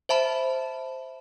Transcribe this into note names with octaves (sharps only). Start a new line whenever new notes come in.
C5 E5 A5 B5